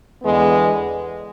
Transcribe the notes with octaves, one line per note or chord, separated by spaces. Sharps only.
E2 D3 G#3 B3